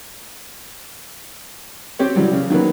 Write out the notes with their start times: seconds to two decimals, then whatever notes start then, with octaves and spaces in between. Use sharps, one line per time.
1.99 C4 G4 C#5
2.16 C#3 E3 F#3 G3
2.33 C#3
2.50 D#3 F#3 A#3 B3